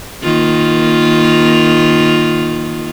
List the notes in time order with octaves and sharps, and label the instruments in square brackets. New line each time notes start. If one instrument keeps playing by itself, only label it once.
[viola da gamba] D#3 A#3 F4